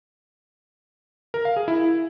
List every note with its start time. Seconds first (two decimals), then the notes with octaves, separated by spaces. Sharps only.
1.34 A#4
1.45 F5
1.56 G#4
1.68 E4